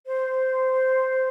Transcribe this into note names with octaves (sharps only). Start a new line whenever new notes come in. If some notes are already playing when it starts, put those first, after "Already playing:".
C5